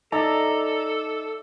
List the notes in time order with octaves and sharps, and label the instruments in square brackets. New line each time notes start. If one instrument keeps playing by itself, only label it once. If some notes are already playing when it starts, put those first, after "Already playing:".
[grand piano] D#4 [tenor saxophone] A4 [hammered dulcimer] D5 E5 A5 [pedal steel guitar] A#5